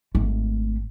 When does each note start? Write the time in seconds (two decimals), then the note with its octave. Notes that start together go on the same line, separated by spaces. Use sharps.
0.15 G#1 A3